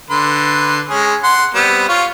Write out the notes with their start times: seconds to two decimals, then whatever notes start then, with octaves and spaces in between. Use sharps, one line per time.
0.10 D3 B4 C6
0.90 G#3 C#4 G#4
1.23 F#5 C6
1.54 G3 B3 C4
1.89 F4 C#5 F5